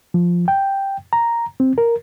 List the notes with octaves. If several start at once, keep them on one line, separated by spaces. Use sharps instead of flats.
F3
G5
A#5
C4
A#4